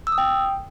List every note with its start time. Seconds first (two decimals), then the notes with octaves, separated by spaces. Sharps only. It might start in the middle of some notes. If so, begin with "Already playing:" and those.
0.07 E6
0.12 D#6
0.18 G5